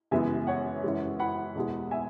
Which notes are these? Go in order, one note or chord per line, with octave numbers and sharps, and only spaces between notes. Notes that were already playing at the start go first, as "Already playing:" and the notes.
F#2 C#3 E3 G#3 B3 E5 G#5
C#5 F#5
F#2 E3 G#3
F#5 B5
E2 B2 G#3
E5 G#5